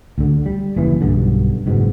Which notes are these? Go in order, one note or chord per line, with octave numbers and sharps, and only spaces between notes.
D2 D3
G3
F#1 D#2 E3
B1 G2 D3
F#1 G#2 B2